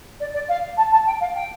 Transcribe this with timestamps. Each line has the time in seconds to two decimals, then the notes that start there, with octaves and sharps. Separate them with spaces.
0.20 D5
0.34 D5
0.48 F5
0.77 A5
0.91 A5
1.06 G5
1.20 F5
1.34 G5